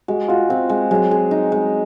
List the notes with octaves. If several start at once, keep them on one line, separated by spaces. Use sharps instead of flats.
G#3 F#4
F4 F#4
C4 F4
G#3
F#3 G#3
G#4
D#4
G#3